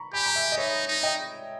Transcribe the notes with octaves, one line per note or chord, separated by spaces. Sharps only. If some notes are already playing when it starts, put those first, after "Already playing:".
Already playing: A#5 B5 C#6
G4 G#5 B5
A#5
E5 G#5
D#5
D#4 C#5 E5
D#4
D#5 G5